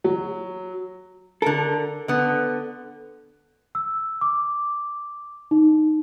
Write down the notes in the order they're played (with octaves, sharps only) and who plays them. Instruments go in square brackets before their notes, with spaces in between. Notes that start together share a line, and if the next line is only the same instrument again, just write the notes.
[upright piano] F#3
[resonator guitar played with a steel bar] D3 A#4 [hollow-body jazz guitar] A4
[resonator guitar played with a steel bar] D3 B3
[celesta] E6
D6
D#4